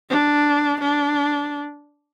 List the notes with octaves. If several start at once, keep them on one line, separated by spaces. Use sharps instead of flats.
D4
D4